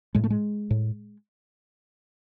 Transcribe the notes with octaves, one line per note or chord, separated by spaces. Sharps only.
A2 G#3
A3
G#3
A2